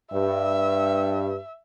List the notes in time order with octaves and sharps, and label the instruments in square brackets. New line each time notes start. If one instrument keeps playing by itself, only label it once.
[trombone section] G2 [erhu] E5